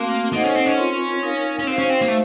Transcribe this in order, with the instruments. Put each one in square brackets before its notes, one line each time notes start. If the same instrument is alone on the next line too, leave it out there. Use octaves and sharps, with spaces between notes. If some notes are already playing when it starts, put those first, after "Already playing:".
Already playing: [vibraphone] A3 C4 F#4 [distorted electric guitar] A#3
[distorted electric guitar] A#3 [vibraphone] D#4 A4 C5 D#5 F#5
[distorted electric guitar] C#4
C4
C#4
[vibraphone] C4 F4 A#4
D#4 A#4 F5
[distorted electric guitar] C#4
[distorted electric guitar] C4 [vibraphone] D#4 F#4 C5 F5
[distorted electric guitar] C#4
C4
A#3
A3